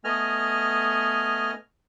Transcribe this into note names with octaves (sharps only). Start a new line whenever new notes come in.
A3 B3 D#5 G#5 F6